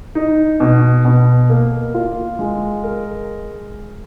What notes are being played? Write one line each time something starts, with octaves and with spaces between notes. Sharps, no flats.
D#4
B2
B2
A#3
F4
G#3
A#4